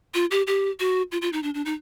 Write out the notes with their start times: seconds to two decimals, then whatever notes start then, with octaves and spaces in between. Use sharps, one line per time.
0.14 F4
0.31 G4
0.47 G4
0.80 F#4
1.12 F4
1.22 F4
1.33 D#4
1.43 D4
1.54 D4
1.65 D#4